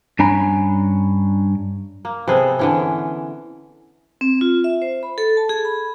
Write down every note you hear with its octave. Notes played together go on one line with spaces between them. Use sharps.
G2 C#4 D4 G#5 A#5 B5
A#3
C3 B3 G#4 A4
D3 E3 C#4
C4
F4
E5
C5
B5
A4
A5
G#4
B5